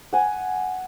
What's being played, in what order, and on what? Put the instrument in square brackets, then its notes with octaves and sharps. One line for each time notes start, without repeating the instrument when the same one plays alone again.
[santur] F#5 G#5